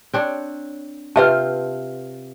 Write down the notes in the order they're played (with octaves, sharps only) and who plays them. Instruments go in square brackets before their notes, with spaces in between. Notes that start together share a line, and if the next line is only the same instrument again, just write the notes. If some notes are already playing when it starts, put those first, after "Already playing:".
[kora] C4 D4 C#5
[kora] C3 C4 F4 [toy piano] B4 E5 A5